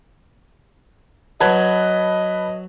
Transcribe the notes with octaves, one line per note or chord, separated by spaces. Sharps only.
F#3 B4 D#5 A5 G#6